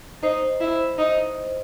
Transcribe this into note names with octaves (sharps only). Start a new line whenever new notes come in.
D#4 C5
E4
D#4